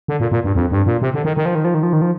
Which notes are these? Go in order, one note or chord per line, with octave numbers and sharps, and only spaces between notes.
D3
A#2
A#2
G2
F2
G2
A#2
C3
D3
D#3
D#3
F3
D#3
F3
D#3
F3
D#3
F3